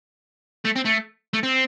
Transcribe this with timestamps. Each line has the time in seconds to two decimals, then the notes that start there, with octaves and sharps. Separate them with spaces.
0.65 A3
0.76 C4
0.85 A3
1.34 A3
1.43 C4